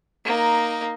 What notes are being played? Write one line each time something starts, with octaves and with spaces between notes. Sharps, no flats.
A#3 D#4